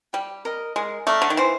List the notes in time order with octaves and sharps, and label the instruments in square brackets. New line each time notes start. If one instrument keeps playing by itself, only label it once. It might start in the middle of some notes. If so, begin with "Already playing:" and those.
[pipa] G3 [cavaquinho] G4
[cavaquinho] A#4 D#5
[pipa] G#3 [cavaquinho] A#4
[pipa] A3 [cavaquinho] D5 F5 A#5
[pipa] D3
D#3
[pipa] E3 [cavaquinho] C5